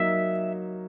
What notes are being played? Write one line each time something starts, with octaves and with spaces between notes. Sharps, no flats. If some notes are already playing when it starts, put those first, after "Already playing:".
Already playing: F#3 A#3 D#4 E5